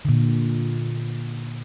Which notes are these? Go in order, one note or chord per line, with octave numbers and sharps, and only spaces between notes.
A#2 D3